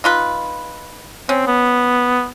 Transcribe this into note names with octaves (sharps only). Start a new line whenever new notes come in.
D#4 F4 B4
C4 C#4
B3